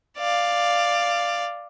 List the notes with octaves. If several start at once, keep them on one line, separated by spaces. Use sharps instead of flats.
D5 F5